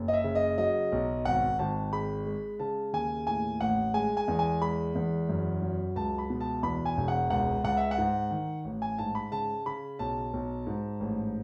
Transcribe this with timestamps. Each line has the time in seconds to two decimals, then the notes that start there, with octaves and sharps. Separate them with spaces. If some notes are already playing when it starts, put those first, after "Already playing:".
Already playing: F#1
0.08 D#5
0.13 E5
0.24 C#3
0.35 D#5
0.58 F#3 D#5
0.92 B1
1.25 G#1 F#5
1.59 G#1 A5
1.93 G#3 B5
2.26 G#3
2.59 C#3 A5
2.93 D#2 G#5
3.27 A2 G#5
3.61 A1 F#5
3.94 G#3 G#5
4.17 G#5
4.28 E2
4.39 G#5
4.61 G#3 B5
4.95 E2
5.29 F#2
5.62 F#3
5.96 C#2 A5
6.18 B5
6.30 B2
6.40 A5
6.63 E2 B5
6.85 G#5
6.97 E1
7.08 F#5
7.30 C#2 F#5
7.64 C#2 F#5
7.77 E5
7.91 F#5
7.98 G#2
8.31 D#3
8.65 A1
8.82 G#5
8.98 G#2 A5
9.15 B5
9.32 C#3 A5
9.66 C#3 B5
9.99 B1 A5
10.33 B1
10.67 G#2
11.00 A1